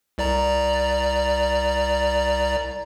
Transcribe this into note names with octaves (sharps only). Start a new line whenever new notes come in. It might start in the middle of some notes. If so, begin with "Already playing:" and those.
C2 D5 A#5